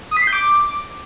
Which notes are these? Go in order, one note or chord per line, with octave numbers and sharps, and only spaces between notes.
D#6
B6
C7
G6
D6